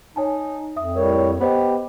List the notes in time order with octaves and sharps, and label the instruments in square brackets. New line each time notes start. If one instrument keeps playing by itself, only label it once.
[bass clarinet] D#4 [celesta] C#5 G#5 A5
[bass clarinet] F2 [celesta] E5 D#6
[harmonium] A2 G3 C#5 [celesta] A#4
[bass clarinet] B3 [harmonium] G4 [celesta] B4 C5 D#5